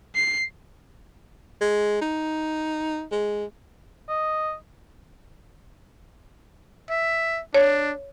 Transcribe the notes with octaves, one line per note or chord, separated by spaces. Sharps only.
C7
G#3
D#4
G#3
D#5
E5
D4 C#5